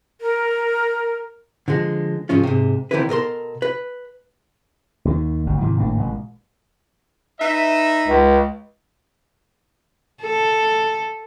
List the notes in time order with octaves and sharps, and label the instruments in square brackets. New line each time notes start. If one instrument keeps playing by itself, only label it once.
[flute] A#4
[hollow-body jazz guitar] D3 F3 G#3
C2 G#2 F3 C#4 F4
G#2 C3
D3 D#3 A#3 C4 E4 B4
B2 A4 A#4 C6
B4
[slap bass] D#2 D#3
G1 D2 G2
G#2 C3 D#3 E3
G#1 A2 A#3 D4
A1 A#2 G#3
[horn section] D#4 B4 E5
[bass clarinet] C#2
[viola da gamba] A4